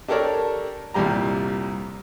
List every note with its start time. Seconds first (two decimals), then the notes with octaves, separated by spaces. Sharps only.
0.08 D4 G4 A4 A#4 C#5 D5
0.94 C2 F2 A#2 G3 G4 A#5